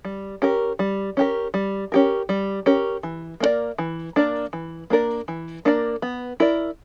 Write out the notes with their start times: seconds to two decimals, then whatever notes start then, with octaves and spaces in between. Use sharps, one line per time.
0.05 G3
0.42 C#4 G4 A#4
0.79 G3
1.17 C#4 G4 A#4
1.54 G3
1.92 C#4 G4 A#4
2.29 G3
2.66 C#4 G4 A#4
3.03 E3
3.40 A#3 D4 A#4 D5
3.78 E3
4.16 A#3 D4 A#4 D5
4.53 E3
4.90 A#3 D4 A#4 D5
5.28 E3
5.65 A#3 D4 A#4 D5
6.02 B3
6.40 E4 A#4 D5